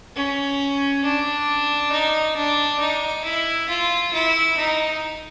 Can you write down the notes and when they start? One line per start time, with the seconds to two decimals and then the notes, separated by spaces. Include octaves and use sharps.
0.16 C#4
1.04 D4
1.92 D#4
2.37 D4
2.80 D#4
3.25 E4
3.69 F4
4.14 E4
4.57 D#4